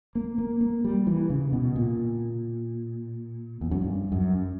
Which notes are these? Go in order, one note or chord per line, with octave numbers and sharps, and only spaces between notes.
A#3
A#3
A#3
G3
E3
C#3
B2
A#2
E2
F#2
G2
F#2